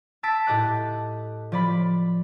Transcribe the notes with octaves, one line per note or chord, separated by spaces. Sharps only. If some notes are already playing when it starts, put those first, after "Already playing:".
A5 E6 A6 B6 D7
A2 G4 D#5 D6 F#6
F3 D5 B5